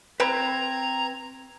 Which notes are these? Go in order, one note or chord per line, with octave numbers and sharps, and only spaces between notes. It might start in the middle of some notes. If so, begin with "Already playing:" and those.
C4 B4 A#5 B5 G#6